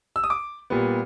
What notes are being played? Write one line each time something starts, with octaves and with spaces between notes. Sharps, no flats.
E6
D#6
D6
A#2 G3 B3